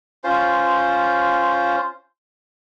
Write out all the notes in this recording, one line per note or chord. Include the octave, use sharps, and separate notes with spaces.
C#4 F4 C5